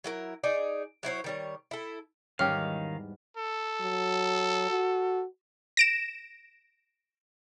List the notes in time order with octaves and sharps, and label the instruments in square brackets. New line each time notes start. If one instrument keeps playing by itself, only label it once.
[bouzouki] F#3 E4 A#4
D#4 G#4 D5
F#3 E4 C5 C#5
D#3 G3 C#5
E4 A4
[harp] E2 G#2 G3 [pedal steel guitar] D#3 F5 [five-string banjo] C#4 G4 [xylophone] F6
[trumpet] A4
[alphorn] F#3
F#4
[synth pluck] A#6 D7 E7